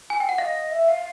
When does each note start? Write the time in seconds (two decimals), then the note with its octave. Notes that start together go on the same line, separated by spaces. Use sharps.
0.10 G#5
0.20 G5
0.29 F#5
0.38 D#5 F5
0.71 E5
0.88 F5